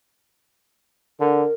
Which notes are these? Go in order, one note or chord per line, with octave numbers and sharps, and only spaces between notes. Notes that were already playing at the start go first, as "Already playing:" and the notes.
D3 A#4